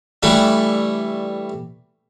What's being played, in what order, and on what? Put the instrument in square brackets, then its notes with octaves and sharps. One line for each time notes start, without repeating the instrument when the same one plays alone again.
[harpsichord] E3 G3 A3 D4